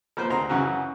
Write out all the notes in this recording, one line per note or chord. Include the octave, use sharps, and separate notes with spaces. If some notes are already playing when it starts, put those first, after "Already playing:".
F3 A#3 B4 C5
D2 C4 A#5 C6
F#2 C#3 E3 F#3 F#4